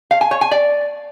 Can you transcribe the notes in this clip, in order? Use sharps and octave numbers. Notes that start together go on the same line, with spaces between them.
F5
G#5
C#5
G#5
D5